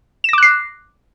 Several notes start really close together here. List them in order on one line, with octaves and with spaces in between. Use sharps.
E7 A#6 D6 F#6 C7